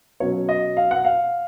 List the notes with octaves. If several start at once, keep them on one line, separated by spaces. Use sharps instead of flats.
B2 F#3 C#4 C#5
D#5
F5
F#5
F5